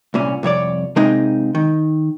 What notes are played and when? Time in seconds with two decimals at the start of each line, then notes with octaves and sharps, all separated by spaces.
0.14 C2 A#2 C#4
0.43 C2 F2 C#5 D5
0.96 C3 G#3 A#3 C4 D#4
1.55 D#3